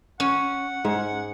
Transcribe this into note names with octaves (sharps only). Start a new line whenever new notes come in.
C#4 F#5
G#2 G#4